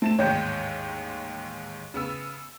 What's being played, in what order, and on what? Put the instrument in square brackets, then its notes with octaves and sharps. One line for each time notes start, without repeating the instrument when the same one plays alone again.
[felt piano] A3 [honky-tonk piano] C4 A5 E7
[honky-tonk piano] A1 D#2 G#2 [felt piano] C#5 G5 G6
[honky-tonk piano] C#3 B3 E6